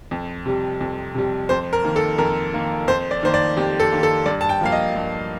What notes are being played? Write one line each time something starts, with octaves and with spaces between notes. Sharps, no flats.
F2
C3 G3
F2
C3 G3
F2 C5
A#4
D#3 A#3
A4
F2 A#4
D#3 A#3
F2 C5
D5
D#3 A#3 C5
D5
F2 G4
A4
D#3 A#3
A4
G2 D5
A5
G5
F3 A#3 F5
D#5
G2